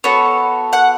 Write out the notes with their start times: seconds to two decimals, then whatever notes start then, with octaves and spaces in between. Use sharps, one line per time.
0.04 B3 F#4 A4 C#5
0.73 F#5